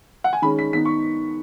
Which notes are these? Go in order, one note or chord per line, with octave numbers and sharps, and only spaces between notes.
F#5
G#5
D#3 G#3 C#4 B5
B6
D#3 B3 D#4 B6
C#6